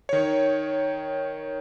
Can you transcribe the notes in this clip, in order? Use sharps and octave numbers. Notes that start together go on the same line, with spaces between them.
D#3 C#5